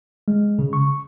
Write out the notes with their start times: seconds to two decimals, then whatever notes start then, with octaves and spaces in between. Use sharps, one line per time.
0.28 G#3
0.59 C#3
0.73 C#6